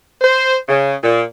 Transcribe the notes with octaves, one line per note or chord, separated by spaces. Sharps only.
C5
C#3
A#2